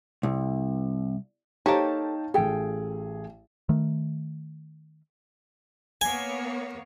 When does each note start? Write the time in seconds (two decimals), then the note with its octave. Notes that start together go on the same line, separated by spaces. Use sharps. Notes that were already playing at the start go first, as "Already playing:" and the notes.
0.23 C2
1.66 A#3 D#4 G4 A4 C5 C#5 G5 A5
2.34 A1 G#4 A4 G5
3.69 D#3 A3
6.01 A#3 B3 C#5 G#5